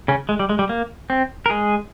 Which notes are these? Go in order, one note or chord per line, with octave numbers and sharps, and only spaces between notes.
C#3 C#4
G#3
G3
G#3
G3
A#3
C4
A#4
G#3 G#4